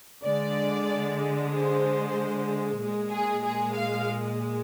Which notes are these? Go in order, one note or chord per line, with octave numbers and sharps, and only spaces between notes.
D3 G#3 D5
C5
A#2 G#3
G#4
G#4
F5